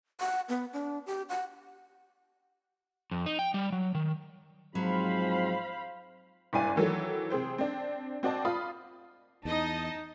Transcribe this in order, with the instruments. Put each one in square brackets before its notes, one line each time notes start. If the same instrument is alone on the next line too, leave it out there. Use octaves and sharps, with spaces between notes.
[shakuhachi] F#5
B3
D4
G4
F#5
[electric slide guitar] F2
D#4
G5
G3
F#3
D#3
[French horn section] G#2 F3 C4 [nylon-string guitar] F#3 [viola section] C5 F5 B5
[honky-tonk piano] F#1 G2 E4 D5 G#5 D#7
D#3 E3 F#3 A3
C3 G#4 C5 G5
C4 D4
C4 F#4 D5 D#5 A5
F4 B5 D#6
[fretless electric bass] E2 [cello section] D#4 [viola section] D#5 [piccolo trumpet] A5